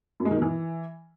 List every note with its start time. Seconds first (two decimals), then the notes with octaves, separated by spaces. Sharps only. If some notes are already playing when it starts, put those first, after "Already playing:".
0.20 F#2
0.25 G#3
0.31 D#3
0.36 B2
0.42 E3